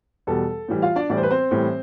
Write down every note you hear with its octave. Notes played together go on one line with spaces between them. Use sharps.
E2 B2 G3 A4
A2 E3 G3
F4 F5
D4 D5
A2 E3 G3 D5
C5
B4
C4 C5
A2 E3 G3